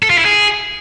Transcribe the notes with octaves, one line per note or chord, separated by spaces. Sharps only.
A4
F4
E4
G#4